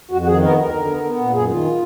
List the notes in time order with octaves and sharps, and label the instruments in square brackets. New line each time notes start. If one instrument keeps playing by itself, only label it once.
[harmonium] F2 F#4
F#4
D#3 G#4
B3 A#4
D2 A#4
D3
B3
B3
A#2
F#2 G#4
D#3 F4